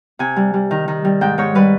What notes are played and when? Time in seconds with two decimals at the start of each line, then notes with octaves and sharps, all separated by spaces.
0.19 C3 G#5
0.36 G3
0.54 G3
0.71 D#3
0.88 D#3
1.05 G3
1.21 G#2 G5
1.38 G#2 C#5
1.55 G3 B4